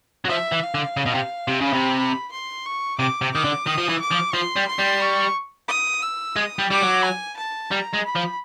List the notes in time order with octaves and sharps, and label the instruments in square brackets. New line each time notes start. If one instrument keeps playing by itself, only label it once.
[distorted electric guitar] F#3
[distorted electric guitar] F3 [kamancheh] E5
[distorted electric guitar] E3
[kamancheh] F5
[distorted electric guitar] D3
C#3
B2
C3
C3
[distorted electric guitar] C#3 [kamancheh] B5
[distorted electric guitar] C3
[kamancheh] B5
C6
C#6
[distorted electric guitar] C3 [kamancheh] D6
[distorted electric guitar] C3
[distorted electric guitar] D#3 [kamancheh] D6
[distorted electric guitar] D3
[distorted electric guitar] D#3 [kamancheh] D#6
[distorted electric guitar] F3
E3
[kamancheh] D6
[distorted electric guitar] F3
[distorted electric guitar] F3 [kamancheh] C6
[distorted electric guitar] G3
[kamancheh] C6
[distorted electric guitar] G3
[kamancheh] C#6
D#6
E6
[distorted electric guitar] G#3 [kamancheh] D#6
[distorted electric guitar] G3
[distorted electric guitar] G3 [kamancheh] D6
[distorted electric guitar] F#3
[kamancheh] G#5
A5
[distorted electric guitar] G3 [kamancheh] A#5
[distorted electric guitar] G#3
[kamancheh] B5
[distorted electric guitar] F3